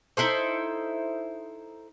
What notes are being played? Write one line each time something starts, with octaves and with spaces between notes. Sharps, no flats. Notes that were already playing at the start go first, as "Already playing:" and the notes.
D#4 E4 A4 C5